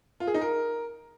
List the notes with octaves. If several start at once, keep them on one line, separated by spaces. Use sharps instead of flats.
F4
G#4
D#4
A#4